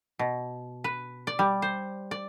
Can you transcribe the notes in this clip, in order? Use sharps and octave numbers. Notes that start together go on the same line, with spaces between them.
B2
B4
D5
G3
C5
D5